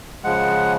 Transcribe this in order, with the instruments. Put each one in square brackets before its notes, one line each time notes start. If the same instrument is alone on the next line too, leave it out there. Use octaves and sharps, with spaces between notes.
[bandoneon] C#3 F3 G#3 F#5